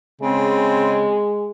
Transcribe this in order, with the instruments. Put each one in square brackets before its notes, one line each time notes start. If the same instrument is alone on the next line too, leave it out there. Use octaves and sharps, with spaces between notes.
[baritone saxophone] C#3 [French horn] G#3 [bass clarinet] C4